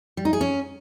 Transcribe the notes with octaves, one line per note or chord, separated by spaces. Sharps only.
G3
D#4
G#4
C#4